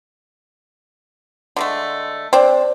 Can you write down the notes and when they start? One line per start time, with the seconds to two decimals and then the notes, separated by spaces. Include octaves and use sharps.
1.57 D3 G#3 A3
2.33 C4 D4 C5 D5